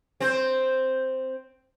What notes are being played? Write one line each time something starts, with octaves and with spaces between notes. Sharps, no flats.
C4 C5